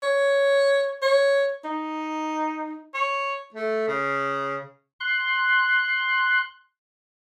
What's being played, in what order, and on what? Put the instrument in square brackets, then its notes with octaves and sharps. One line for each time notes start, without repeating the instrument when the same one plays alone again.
[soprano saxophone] C#5
C#5
D#4
[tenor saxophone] C#5
A3
C#3
[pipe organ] C6 F#6